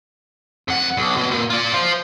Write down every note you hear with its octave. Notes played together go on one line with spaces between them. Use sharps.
F2 F#5
B1
B2
A#2
F4 D5
C5 F5